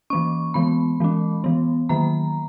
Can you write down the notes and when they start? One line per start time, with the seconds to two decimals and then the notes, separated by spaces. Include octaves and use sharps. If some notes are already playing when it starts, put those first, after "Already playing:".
0.10 E3 A#3 C#4 C#6
0.54 E3 G#3 B3 B5
1.00 E3 G#3 C#4
1.44 E3 B3
1.89 D#3 F#3 A#3 A#5